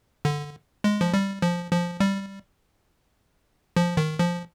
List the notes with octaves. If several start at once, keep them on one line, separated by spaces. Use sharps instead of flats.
D3
G#3
F3
G3
F3
F3
G3
F3
D#3
F3